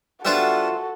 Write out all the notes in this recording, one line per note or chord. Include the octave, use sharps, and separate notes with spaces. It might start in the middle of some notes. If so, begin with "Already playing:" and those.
G3 B3 D4 F4 F#4 A4 C5 E5